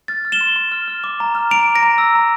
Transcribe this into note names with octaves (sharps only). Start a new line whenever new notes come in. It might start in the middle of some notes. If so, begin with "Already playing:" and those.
F6 A6
F6
E7 G7
C6
C6
F6
F6
D6
A#5
F6
A#5 D7 F7
D6
A#6 D7
A#5
E6
A#5